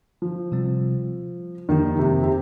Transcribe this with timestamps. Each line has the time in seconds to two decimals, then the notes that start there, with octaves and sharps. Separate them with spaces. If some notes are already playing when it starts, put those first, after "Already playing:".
0.22 F3
0.52 C3 G3 C4
1.69 F2 D#3 F3 A#3 D#4 G4
1.99 C3
2.23 C3